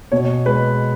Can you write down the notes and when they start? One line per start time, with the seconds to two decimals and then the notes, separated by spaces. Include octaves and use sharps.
0.12 B2 C#5
0.46 G#3 B4